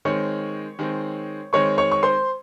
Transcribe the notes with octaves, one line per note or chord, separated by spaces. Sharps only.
D#3 G#3 C4 C#5 C#6
D#3 G#3 C4
D#3 G#3 C4 C#5 C#6
C#5 C#6
C#6
C5 C6